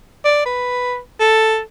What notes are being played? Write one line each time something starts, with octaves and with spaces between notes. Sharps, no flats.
D5
B4
A4